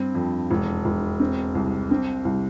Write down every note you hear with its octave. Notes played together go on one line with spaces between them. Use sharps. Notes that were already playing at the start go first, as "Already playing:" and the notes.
Already playing: G2 C4
F2
E1
E1
C4
C2
C4
C2